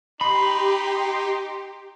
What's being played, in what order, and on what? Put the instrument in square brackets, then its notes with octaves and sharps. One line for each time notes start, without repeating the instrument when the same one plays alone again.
[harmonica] D#4 C6 [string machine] G4 [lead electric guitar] B5